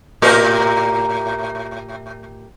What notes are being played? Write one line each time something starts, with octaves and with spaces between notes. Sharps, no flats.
A2 G4 A#4